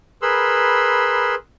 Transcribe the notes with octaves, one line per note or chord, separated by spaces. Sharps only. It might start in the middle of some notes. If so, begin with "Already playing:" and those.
G#4 A#4 B4 B5 C6 E6